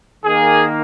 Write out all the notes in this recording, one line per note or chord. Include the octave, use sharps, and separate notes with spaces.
D#3 A#3 G#4